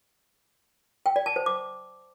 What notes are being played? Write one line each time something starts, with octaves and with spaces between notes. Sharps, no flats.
G5
D5
A5
C5
D6